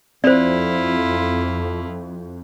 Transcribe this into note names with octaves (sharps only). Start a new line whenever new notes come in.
F2 C4 E4 F4 C5 D5